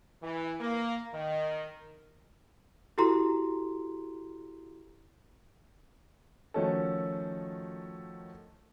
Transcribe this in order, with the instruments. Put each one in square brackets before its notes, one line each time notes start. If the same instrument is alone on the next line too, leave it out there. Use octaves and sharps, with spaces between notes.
[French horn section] E3
A#3
D#3
[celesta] E4 F#4 G4 A4 A#5 C6
[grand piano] D#3 F3 A3 C#4 F#4 A4